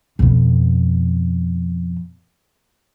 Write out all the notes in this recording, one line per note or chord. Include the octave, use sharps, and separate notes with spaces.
F2 B2